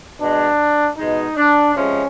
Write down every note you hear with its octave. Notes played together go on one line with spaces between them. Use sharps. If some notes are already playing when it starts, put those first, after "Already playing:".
B2 G#3 D4
B2 G#3 D#4
D4
C3 F3 G#3 C#4